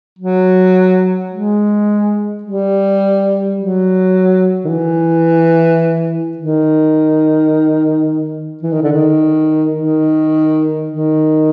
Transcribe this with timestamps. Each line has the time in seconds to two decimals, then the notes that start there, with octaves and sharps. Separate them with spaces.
0.19 F#3
1.31 G#3
2.43 G3
3.56 F#3
4.64 D#3
4.69 E3
6.37 D#3
8.62 E3
8.72 D#3
8.82 D3
8.92 D#3
9.75 D#3
10.87 D#3